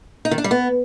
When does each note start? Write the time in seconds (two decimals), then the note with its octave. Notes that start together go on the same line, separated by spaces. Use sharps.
0.25 D#4
0.31 D#3
0.38 D4
0.44 G3
0.51 B3